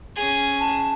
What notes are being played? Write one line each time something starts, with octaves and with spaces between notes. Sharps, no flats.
C#4 G#4
A5